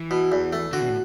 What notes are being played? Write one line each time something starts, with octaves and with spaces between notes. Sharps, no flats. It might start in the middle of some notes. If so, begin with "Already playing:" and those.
Already playing: E3
B2
E2
A3
D3 F#4
B2
A2